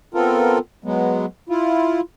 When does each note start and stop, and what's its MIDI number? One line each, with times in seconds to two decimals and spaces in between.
0.14 0.58 59
0.14 0.58 60
0.14 0.58 65
0.14 0.58 69
0.14 0.58 70
0.84 1.26 54
0.84 1.26 56
0.84 1.26 59
1.49 2.01 64
1.49 2.01 65